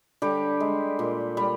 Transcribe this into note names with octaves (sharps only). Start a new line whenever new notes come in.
D3 G3 G4
G#3
A#2
G3